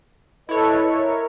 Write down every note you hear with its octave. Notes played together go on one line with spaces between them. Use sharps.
E4 A4 B4 C#5 D#5
A#4